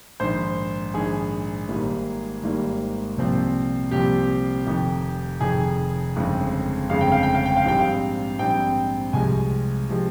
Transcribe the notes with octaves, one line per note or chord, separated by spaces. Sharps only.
A#1 G#2 D#3 C5
A#1 G#2 D#3 G#4
G#1 G#2 G3 A#3
G#1 G#2 G3 A#3
C2 A#2 F3 C4
C2 A#2 F3 C4 G4
F1 F2 D#3
F1 F2 D#3 G#4
G1 F2 C#3 G#3 C4
G1 F2 C#3 G#3 C4 F5
G5
F5
G5
F5
G5
F5
A#1 G#2 G3 C4 G5
F5
A#1 G#2 G3 C4 G5
C2 C3 F3 G#3 G#5
C3 F3 G#3